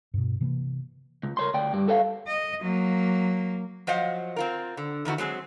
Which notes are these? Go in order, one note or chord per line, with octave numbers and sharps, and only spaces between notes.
G2 B2
C3 E3 A#3
C#2
A#4 C#5 C6
D2 D5 G5
G2 G3
A4 B4 C#5 E5 F5
D#5
F#3 A#3
F3 F#3 C5 D#5 F5 F#5
C4 F4 A#4
D3
E2 D#3 E3 F#4
F#3 G#3 C4 G#4